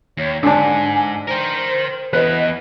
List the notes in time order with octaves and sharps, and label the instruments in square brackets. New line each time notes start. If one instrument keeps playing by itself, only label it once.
[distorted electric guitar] D#2 [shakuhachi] C#5
[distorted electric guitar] G#2 [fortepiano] D3 D4 [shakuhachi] G#5
[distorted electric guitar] A#4 G5 [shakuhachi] C5
[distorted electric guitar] E3 B3 [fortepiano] B4 [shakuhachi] D#5